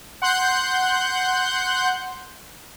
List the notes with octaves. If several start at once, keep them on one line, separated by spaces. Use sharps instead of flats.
F#5 C6 F#6 G6